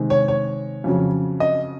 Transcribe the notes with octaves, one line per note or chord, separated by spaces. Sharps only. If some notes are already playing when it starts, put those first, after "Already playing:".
Already playing: C3 D#3 G#3
C#5
C#5
F2 C#3 F#3
D#5